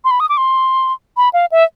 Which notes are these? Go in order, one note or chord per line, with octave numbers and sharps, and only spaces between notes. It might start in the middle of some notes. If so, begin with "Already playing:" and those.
C6
B5
D#6
D6
C6
B5
F5
E5